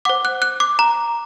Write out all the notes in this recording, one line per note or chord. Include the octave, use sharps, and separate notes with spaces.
C5 F#5 D6
F#6
F#6
D6
A#5